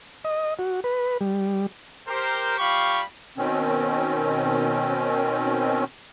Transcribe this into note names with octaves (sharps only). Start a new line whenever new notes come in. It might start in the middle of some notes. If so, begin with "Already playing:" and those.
D#5
F#4
B4
G3
G4 A#4 C5
G3 F4 G4 F5 B5 C#6
B2 D#3 C4 C#4